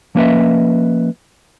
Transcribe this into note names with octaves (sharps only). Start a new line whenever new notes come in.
F3 A#3 C#4 B4 D#5 E5